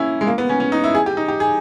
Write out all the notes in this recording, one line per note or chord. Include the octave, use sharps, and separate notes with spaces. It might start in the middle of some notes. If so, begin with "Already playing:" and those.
Already playing: A#3 C#4 E4
G#3
A#3
B3
C#4
C#4
D#4
E4
G#4
G4
D#4
G4
G#4